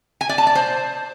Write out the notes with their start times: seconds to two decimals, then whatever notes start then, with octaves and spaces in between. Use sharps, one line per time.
0.21 G#5
0.29 D5
0.38 A5
0.47 D5
0.55 C5